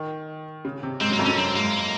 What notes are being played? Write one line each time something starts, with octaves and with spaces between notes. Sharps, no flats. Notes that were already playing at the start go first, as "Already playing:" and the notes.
Already playing: D#3
C#3
C3
G#2 C4
F#2 A#3
F2
F#2 C#4
F#2 C4
G#2 A#3